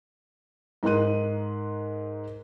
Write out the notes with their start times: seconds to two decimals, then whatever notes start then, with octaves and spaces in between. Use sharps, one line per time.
0.83 G#2 D#4 A#4 C6 F#6 D#7